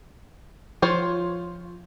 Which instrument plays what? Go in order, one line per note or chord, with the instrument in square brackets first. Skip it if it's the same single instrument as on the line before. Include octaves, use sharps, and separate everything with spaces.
[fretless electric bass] F3 [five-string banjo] F4 C5 C#5